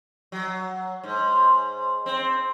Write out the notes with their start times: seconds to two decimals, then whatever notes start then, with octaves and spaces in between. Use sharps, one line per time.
0.32 F#3
1.03 G#2
2.06 C4